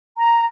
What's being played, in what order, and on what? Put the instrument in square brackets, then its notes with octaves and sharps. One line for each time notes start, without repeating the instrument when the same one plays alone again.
[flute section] A#5